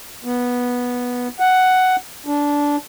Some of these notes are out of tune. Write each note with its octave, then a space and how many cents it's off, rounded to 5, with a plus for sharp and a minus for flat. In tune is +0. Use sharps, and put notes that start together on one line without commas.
B3 -10
F#5 +5
D4 -15